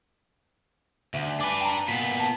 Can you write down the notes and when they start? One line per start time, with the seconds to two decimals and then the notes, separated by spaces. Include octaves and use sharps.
1.14 D2 E5
1.40 D4 B4 G#5 D6
1.61 G5 A5 A#5
1.88 A#2 B3 B6
2.20 A5